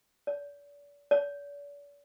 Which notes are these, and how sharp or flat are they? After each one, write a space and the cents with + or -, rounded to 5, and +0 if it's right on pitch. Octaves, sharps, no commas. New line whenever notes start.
D5 -40
D5 -45